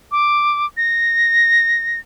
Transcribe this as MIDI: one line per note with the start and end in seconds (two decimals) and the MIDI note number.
0.11 0.66 86
0.77 2.00 94